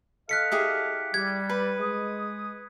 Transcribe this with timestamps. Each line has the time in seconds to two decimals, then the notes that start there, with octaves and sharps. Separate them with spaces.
0.29 A4 D#5 F5 F#6 B6 C#7
0.52 E4 G4 G#4
1.14 G3 G#6
1.49 B4 B5
1.79 G#3 D#6